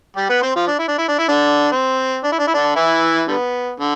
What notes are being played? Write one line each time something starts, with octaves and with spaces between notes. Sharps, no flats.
G3 G4
B3 B4
C4 C5
F3 F4
D4
E4
D4
E4
D4
E4
D3 D4
C4
D4
E4
D4
E4
D3 D4
E3 E4
D3 G3 B3
D3